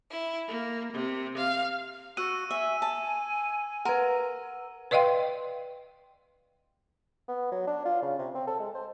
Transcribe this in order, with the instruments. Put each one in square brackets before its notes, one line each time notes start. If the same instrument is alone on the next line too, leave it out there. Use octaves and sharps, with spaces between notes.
[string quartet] E4
A#3
C3
F5
[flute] F#4 [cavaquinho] F#5 [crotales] E6 D#7
[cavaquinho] E5 [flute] G#5
[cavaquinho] A5
[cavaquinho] A#4 [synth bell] B4 F#5
[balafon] B4 D5 D#5 F5 G5 C6
[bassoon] B3
F#3
D4
F4
C#3
C3
C4
A4
G#3
C5